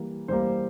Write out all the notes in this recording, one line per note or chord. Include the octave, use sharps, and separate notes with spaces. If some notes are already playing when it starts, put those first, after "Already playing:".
Already playing: E3 G3 A#3
E3 G3 A#3 C5